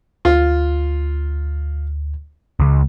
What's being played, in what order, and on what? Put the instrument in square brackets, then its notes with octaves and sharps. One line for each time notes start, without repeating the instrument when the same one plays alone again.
[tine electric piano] D2 [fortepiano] F4
[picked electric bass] C#2